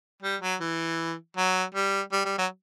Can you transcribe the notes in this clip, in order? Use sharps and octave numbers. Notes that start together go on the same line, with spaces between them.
G3
F#3
E3
F#3
G3
G3
G3
F#3